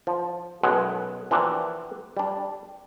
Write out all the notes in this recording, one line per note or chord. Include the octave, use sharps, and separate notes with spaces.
F3
B1 F#2 B2 G#3 F#5
E3 F3 A#3 D4 F#4 G4
G3 D4